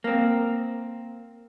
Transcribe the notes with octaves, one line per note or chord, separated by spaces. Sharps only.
A#3 C4